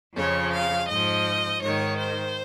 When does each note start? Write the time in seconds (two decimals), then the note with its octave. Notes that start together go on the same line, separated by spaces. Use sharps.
0.15 F2 C#3 F3 C#5
0.52 F5
0.89 G#2 F3 D#5
1.61 G#2 D#3 C#5
1.97 C5